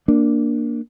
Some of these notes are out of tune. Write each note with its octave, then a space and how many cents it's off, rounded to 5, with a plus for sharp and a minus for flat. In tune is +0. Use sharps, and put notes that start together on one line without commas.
A#3 +0 D4 +0